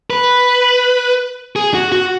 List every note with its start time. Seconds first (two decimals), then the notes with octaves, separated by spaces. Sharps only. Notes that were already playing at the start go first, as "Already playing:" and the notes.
0.10 B4
1.56 G#4
1.74 F#4
1.92 F#4